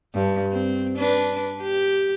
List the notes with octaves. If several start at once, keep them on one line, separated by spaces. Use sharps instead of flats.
G2
C4
D4 B4
G4